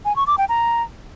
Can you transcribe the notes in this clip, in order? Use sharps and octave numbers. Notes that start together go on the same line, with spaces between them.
G#5
C#6
D6
G5
A#5